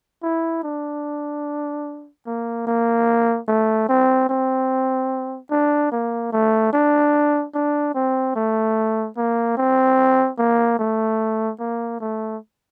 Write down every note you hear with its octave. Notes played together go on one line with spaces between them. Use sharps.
E4
D4
A#3
A#3
A3
C4
C4
D4
A#3
A3
D4
D4
C4
A3
A#3
C4
A#3
A3
A#3
A3